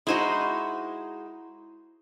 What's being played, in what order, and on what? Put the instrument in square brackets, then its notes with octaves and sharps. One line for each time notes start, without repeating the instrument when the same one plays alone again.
[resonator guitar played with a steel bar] G#3 D#4 F#4 [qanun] E4 C5